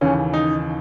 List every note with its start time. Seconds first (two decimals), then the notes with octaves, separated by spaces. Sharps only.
0.01 D#2 C#3 E3 C#4
0.33 D#4